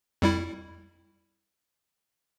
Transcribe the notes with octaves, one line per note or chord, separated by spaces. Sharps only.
F2 G3 E4